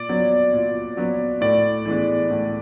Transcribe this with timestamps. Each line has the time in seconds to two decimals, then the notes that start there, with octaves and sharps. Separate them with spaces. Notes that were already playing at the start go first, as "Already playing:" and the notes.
Already playing: A#2 D5
0.09 F#3 B3
0.53 A#2
0.97 F#3 B3
1.41 A2 D5
1.85 E3 G#3 B3
2.30 A2